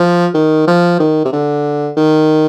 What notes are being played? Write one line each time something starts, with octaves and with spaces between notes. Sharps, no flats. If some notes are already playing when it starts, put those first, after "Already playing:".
Already playing: F3
D#3
F3
D#3
C3
D3
D#3